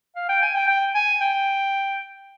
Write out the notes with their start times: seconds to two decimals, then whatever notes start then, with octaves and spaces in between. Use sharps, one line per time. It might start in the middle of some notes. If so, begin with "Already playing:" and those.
0.16 F5
0.29 G5
0.42 G#5
0.55 G5
0.68 G5
0.95 G#5
1.21 G5